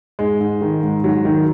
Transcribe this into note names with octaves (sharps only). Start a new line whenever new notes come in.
G#2 G#3
G#2
D#3
G#2
G#2 F#3
D#3